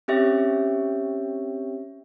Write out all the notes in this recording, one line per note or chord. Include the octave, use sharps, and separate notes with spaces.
C4 C#4 G4 C#5 E5